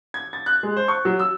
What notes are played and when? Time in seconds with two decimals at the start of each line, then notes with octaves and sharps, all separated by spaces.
0.14 G#6
0.33 A6
0.46 F#6
0.63 G#3
0.77 C5
0.88 C#6
1.05 F#3
1.19 E6